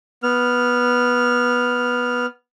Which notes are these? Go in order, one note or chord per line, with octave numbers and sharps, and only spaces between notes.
B3 F6